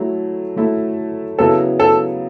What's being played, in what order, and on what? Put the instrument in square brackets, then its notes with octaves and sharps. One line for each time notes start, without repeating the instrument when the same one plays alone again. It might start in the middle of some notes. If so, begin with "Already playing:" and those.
Already playing: [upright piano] F#3 A3 E4
F#3 A3 E4
[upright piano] C#3 F#3 B3 E4 [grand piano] A4
[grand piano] A4